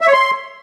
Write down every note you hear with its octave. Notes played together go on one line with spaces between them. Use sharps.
E5
C#5
C6